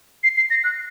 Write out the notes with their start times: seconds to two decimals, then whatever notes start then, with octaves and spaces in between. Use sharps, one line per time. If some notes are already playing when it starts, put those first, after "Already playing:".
0.24 C7
0.37 C7
0.50 A#6
0.64 F#6